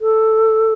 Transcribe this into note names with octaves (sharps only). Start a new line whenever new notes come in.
A4